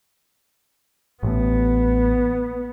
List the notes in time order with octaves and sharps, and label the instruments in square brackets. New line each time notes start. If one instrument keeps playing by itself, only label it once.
[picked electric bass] A1 A2 [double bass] B3